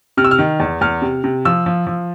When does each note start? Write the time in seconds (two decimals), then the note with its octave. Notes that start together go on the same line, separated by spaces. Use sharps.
0.17 C3 F6
0.24 E6
0.31 F6
0.39 D#3
0.60 E2
0.81 E2 F6
1.02 C3
1.24 C3
1.45 F3 E6
1.66 F3
1.87 F3